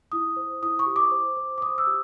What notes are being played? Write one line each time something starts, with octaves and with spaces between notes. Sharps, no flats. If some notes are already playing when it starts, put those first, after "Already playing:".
E4 D#6
C5
E4 D#6
C#6
G4
D6
C5
C5
D6
C5 D#6
E6
G4